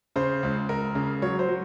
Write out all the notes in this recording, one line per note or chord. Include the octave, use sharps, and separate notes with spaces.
C#3 C5
C#2
C#2 A#4
C#3
F#3 C#5
C5
F#3